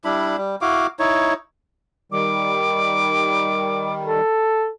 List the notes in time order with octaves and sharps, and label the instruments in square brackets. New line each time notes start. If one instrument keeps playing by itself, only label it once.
[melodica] G3 D4 E4 B5
G3
E4 F#4 F5 D6
D#4 E4 C#5
[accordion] D#3 G3 [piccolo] D6
[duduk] A4